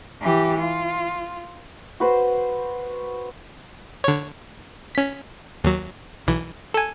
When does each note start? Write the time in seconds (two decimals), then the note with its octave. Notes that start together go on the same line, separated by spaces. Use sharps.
0.21 E3 G4
0.59 F4
2.00 F#4 B4 C5
4.04 D3 C#5
4.95 C#4 B6
5.64 D#2 F#3
6.27 B1 E3
6.74 A4 G#5